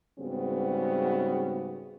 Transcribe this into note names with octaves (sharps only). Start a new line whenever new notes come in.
G#2 C#3 G3 B3 C4 F#4